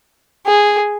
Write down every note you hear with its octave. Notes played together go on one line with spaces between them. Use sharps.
G#4